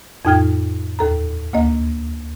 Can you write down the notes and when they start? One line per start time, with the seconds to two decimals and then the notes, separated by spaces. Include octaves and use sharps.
0.25 F2 A2 D#4 G5 F6 G#6
0.99 D#2 A4 A#5
1.53 D2 A#3 D#5